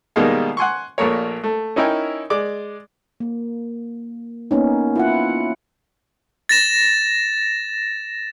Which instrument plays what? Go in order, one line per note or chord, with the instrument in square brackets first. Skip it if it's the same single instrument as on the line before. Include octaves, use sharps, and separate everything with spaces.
[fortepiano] B2 D#3 G3 G#3 A#3
F#5 G#5 C6 C#6
A#1 A#2 A3 A#4 C#5
A3
C#4 D#4 E4 A#4 G5 G#5
G#3 D5 D6
[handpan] A#3
A#3 B3 C#4 D#4
E4 F4 F#5
[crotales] A6 A#6 E7